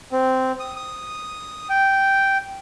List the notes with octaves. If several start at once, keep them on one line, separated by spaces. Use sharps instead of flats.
C4
D#6
D#6
G5